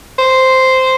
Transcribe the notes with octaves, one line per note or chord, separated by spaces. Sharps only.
C5